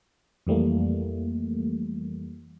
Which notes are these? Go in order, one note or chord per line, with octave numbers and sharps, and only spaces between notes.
F2 E3 G3 A3 A#3